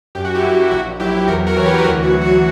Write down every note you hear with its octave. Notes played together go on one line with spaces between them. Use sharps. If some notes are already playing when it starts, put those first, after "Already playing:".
F#2 G4
F#4
E4 G4
F#3
A#1 F#4
F#3 E4 G4
E2 F#4 A#4
F#4 A#4
E3 C#5
G4 B4
B4
D2 F#4 A#4
F#4
F#3
F#4